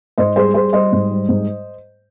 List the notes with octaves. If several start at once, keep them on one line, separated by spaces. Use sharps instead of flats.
G#2 C5 D#5
G3 G#4 C5
G3 G#4 C5
G3 C5 D#5
G#2
G3
G#2